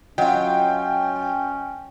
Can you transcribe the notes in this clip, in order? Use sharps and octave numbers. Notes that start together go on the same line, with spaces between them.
F#3 C#4 F4 D#5 F#5 G5